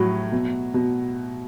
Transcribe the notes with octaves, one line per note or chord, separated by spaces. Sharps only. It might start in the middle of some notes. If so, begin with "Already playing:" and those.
Already playing: A2 F#3
B2
B2